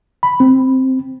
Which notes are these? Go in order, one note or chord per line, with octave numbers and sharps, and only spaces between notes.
B5
C4